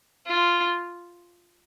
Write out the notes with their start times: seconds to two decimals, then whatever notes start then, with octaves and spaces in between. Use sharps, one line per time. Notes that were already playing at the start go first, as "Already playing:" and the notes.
0.27 F4